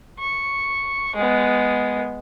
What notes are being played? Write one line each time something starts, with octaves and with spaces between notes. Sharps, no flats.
C#6
G#3 B3